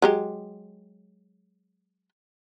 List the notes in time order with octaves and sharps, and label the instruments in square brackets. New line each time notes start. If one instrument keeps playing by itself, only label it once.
[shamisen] F#3 G#3 G4